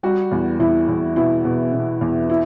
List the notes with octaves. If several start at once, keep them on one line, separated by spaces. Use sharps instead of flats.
G3 F#4
E2
E2 E4
E2
B2 E4
B2
B2
E2
E4